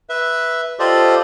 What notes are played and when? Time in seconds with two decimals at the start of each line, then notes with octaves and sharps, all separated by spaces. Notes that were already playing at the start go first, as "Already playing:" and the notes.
0.10 B4 E5
0.79 F4 G4 A4 C5 D5 D#5